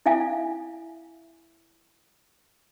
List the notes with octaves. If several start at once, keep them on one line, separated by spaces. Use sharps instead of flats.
E4 E5 F5 G#5